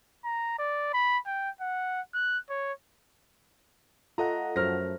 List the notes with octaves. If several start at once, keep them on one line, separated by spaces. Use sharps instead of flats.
A#5
D5
B5
G5
F#5
F#6
C#5
A3 F4 A4 D#5 F#5 A#5
F#2 F3 A3 A#4 F6 A#6